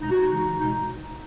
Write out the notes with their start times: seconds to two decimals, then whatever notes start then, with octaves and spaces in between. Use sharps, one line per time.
0.01 B2 G#3 D#4
0.11 F#4
0.21 D#4
0.31 C#3 E3 G#3
0.60 B2 G#3 D#4